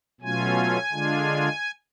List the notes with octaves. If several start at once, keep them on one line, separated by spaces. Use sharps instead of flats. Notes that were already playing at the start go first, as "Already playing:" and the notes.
B2 F#3 A3 C#4 F4 G#5
D3 G#3 D4 F4